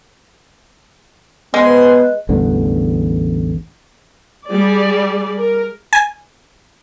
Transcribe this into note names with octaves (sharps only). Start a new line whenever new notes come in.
G#3 B3 G#4 B4 C5 C6
A1 E2 G2 D3
G3 G#4 D5
A#4
G#5